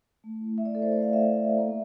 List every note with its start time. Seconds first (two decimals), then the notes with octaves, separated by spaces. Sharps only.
0.24 A3
0.41 E4
0.57 A3 E5
0.65 D5
0.75 E4 A4
0.82 C5
0.91 A3 D5
1.03 F5
1.08 E4
1.13 E5
1.24 A3
1.41 E4
1.58 A#3